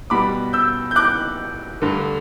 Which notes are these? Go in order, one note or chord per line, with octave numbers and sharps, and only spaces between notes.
B2 G3 B3 B5 D6
E6 G6
G6
D6 F#6
G2 D3 A3